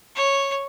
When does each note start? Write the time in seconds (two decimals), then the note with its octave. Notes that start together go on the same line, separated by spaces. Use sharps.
0.16 C#5